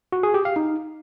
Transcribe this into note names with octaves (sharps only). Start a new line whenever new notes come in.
F#4
G#4
G4
F5
D#4